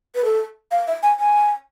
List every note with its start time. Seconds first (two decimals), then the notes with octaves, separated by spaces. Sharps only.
0.15 B4
0.25 A4
0.71 F5
0.87 E5
1.03 G#5
1.19 G#5